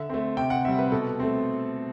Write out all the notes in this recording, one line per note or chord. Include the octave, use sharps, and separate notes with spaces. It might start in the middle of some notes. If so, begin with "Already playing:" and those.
Already playing: D3 E5
A3 C4
C3 G5
F#5
G3 C4 E5
B4
B2 A4
A3 C4